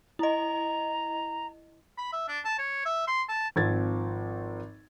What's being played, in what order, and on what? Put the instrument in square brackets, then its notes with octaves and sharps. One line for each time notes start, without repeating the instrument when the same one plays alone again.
[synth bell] E4 D#5 [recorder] A#5
[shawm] B5
E5
D4
A5
C#5
E5
C6
A5
[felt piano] G#1 F3 C4 G#6 A6